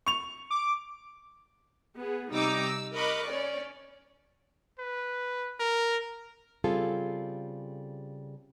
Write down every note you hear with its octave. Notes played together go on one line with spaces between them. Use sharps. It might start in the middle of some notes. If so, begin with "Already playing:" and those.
C#6 F7
D6
B3 G#4
C3 G3 D#4 A#5 D6 E6
E6
A#4 D#5 B5 C#6 D6 F#6
C#4 C#5 D5
B4
A#4
C#3 G3 C4 F4 G#4 A4